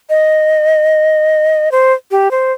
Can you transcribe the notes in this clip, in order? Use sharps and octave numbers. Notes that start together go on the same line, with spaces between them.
D#5
C5
G4
C5